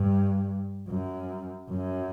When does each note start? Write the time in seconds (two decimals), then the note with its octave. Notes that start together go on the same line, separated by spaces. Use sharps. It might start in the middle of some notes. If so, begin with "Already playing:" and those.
Already playing: G2
0.89 F#2
1.71 F#2